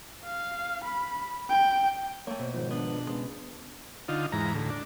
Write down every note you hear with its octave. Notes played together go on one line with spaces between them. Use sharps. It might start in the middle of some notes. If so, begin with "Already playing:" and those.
F5
B5
G5
A3 A#3 C#5
B2 C5
G#2 D#3 F3 C5
B3 D4
C#3 G#3 B3
D3 D#4 F4
E2 G#2 A#5
D2 A2
D4